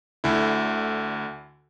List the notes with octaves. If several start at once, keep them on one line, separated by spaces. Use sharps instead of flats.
D2 D3 E4